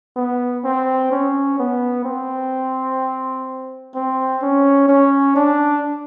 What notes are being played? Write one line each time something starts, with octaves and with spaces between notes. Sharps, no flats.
B3
C4
C#4
B3
C4
C4
C#4
C#4
D4